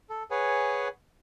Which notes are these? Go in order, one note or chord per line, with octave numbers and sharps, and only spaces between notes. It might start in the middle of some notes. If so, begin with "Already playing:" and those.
A4
G#4 B4 C#5 F#5 G#5